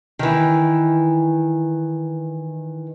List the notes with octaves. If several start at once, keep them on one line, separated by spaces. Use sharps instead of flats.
D#3 E3